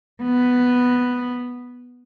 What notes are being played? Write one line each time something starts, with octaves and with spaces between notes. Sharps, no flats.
B3